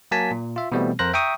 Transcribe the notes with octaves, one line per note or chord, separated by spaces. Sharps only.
F#3 A#3 G#5 A5 B6
A#2
F4 E5
B2 E3 G3 A3 B3 C4
F2 A#4 C5 F#6 A#6
E5 G5 A#5 C#6 D#6